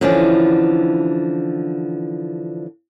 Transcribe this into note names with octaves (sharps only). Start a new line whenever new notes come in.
D3 E3 F3 C#4 D4